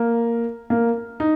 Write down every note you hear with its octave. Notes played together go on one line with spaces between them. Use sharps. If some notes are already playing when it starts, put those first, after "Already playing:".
Already playing: A#3
A#3
D#4